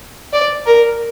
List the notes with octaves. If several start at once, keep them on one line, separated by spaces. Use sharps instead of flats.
D5
A#4